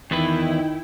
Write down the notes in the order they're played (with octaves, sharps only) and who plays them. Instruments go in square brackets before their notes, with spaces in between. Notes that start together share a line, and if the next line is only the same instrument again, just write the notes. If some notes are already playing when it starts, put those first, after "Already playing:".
[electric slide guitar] E2 B3 B4 [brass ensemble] D#3 [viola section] E4 G5